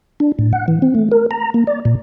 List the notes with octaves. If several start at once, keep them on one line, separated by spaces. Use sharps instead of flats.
D4
A2
F#5
E3
C4
A3
A#4
A#5
A#3
D5
A#2